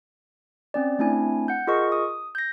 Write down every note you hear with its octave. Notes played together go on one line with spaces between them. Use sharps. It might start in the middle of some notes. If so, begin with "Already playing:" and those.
C4 C#4 D5
A3 C4 D4 E4 G#5
F#5 G6
F4 G#4 A#4 D#5 C#6
D#6
G6 A#6